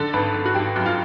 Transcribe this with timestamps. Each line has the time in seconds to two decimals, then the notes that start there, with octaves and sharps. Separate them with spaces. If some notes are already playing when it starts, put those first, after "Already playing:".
Already playing: D3 A4
0.13 G#1 B4
0.34 G#1
0.46 F#4
0.55 G#1 G4
0.76 F#2
0.86 F4